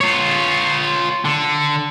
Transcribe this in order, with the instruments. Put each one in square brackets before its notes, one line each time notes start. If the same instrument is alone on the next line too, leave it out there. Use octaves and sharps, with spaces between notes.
[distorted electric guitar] F4 C#5
D3